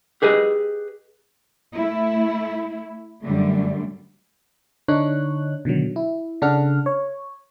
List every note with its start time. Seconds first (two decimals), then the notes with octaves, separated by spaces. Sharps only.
0.22 G4 G#4 B4 D#5
1.73 A3 E4
3.22 F#2 D3 G3 A3
4.88 D3 D4 D#4 C#5 F#6
5.65 B2 D3 D#3 F#3
5.96 E4
6.42 C#3 D4 A4 F#5 F6
6.86 C#5